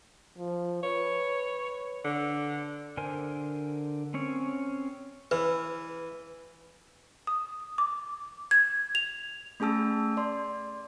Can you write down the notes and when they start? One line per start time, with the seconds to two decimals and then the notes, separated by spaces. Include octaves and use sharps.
0.38 F3
0.83 B4 C#5
2.04 D3
2.97 D3 A#4 C5 G#5
4.14 C4 C#4 C#5
5.31 E3 B4
7.27 D#6
7.78 D6
8.51 G#6
8.95 F7
9.60 A3 C#4 G#4 A5 E6
10.17 D5 C6